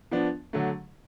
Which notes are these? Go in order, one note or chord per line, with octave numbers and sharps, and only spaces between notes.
F3 B3 D4
D3 F#3 A3